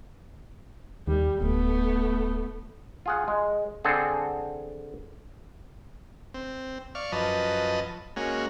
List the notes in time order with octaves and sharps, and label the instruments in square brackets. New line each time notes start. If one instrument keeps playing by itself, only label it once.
[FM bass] D#2 [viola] G3
[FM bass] D1 [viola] A3 B3
[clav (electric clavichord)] F4 G#4 F#5
G#3
D3 C4 G#4 A4
[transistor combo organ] C4
D5 F5 C#6
F#2 F3 B4 D#5 A5
G#3 A#3 C#4 F#4